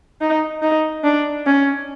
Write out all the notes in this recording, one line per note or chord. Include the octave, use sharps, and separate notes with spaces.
D#4
D#4
D4
C#4